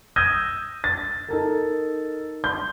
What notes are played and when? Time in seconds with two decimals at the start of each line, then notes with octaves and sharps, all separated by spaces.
0.16 D#6 E6 G6 G#6 A#6 D#7
0.84 A6
1.28 D#4 A4 A#4
2.44 C6 G6